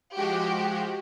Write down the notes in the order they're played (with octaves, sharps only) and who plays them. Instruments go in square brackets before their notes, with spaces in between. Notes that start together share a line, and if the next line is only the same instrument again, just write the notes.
[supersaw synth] F3 G#3 F#4 [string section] G4